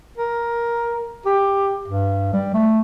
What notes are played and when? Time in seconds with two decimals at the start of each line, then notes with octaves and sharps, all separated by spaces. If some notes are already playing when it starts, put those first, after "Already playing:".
0.17 A#4
1.26 G4
1.88 G2
2.33 G3
2.54 A3